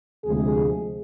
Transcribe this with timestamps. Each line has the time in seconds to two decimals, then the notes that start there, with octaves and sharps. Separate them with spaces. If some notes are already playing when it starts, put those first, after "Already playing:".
0.24 D2 C3 F3 G#3 G#4